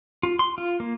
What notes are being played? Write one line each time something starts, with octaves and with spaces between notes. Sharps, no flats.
F4
C6
F4
A#3